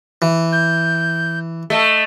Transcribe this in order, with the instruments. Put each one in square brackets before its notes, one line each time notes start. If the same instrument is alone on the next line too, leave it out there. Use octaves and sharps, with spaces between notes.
[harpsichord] E3
[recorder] G6
[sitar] A3 [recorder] D#5